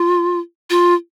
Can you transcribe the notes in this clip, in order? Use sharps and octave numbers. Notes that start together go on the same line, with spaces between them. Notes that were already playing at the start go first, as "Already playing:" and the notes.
Already playing: F4
F4